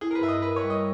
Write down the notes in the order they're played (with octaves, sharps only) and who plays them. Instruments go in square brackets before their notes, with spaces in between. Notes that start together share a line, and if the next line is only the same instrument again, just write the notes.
[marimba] E4 [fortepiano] G#4
[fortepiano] A#4
B4
[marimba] G2 [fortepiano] E5
[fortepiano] D#5
[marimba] A#4 [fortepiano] B4
[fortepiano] C#5
[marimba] G3
[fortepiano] D#5